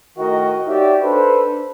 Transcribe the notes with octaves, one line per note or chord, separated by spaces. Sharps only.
A2 D#3 F#4 A#4 D#5 G5
D#4 F#4 G4 C#5 D5 E5
D4 A4 B4 C5